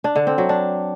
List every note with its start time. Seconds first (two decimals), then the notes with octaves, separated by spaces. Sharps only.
0.04 D4
0.16 D3
0.27 C4
0.38 F#3
0.49 D4